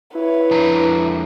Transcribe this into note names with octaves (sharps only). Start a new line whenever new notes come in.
E4 B4 C#5
F2 D4 A#5